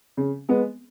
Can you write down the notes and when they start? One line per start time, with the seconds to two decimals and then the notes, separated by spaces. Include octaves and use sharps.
0.17 C#3
0.49 G#3 B3